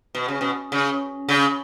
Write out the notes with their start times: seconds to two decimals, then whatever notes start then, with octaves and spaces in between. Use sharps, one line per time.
0.15 B2
0.28 C#3
0.41 B2
0.72 C#3
1.29 C#3